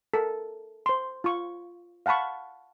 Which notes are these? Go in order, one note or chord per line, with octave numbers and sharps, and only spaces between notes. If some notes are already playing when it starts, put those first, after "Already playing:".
A4 A#4
C5 C6
F4 C#6
F5 F#5 A5 B5 C#6